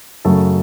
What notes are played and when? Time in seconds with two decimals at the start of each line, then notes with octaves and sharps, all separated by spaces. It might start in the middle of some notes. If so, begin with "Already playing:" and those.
0.25 F#2 C#3 F#3 A3 C#4 A4